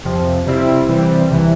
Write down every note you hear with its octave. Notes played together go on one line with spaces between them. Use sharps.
F2 C3 F3
C3 G3 C4 E4
C3 E3 G3 C4
C2 C3 E3